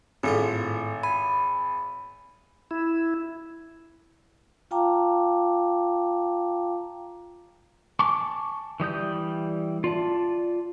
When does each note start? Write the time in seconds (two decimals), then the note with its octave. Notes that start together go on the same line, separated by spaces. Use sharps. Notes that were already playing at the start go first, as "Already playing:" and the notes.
0.23 G#1 A2 A3 F4
1.03 G#5 B5
2.71 E4
4.71 F4 F5 G5 A5 A#5 D6
7.99 G#5 A5 C#6 D6
8.80 E3 G3 D#6 G6
9.84 F4 D5 A5